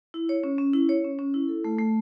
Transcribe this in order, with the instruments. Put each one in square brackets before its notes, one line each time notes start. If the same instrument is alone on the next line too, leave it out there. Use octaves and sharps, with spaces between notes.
[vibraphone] E4
C#5
C#4
C#4
E4
C#5
C#4
C#4
E4
A4
A3
A3